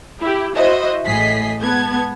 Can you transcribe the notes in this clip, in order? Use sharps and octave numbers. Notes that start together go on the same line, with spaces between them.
E4 G4
E4 F#4 C5 D#5 E5
A1 A2 G#4 D#5 B6 C7
G#3 B3 A5 G#6